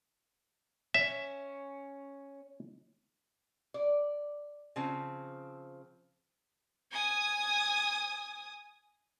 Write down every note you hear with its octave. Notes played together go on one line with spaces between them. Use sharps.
C#4 E5
D5
C#3 F3 C4
G#5 D#6